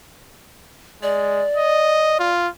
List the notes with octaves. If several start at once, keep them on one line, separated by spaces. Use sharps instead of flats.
G#3 D5
D#5
F4